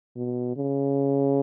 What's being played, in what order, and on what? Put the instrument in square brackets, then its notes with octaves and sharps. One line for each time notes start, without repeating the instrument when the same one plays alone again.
[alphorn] B2
C#3